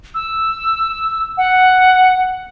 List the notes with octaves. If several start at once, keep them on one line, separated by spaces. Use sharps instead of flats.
E6
F#5